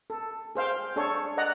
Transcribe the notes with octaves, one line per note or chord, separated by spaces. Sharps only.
A4
G#4 C5 F5 G5
D4 G#4 A4 C#5
D5 D#5 F#5 A#5